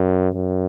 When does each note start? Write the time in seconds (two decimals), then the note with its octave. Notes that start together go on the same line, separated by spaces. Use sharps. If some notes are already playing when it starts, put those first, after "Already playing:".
Already playing: F#2
0.34 F#2